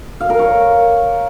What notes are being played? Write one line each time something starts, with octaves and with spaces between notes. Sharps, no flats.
F5
A#4
C#5